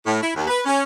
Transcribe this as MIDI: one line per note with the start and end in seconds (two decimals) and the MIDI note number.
0.06 0.19 45
0.22 0.31 64
0.34 0.47 39
0.48 0.59 71
0.66 0.83 61